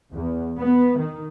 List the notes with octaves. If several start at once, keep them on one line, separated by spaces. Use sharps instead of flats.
E2
B3
D#3